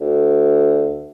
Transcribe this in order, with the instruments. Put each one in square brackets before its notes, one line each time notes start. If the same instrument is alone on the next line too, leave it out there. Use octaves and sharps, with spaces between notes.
[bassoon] D2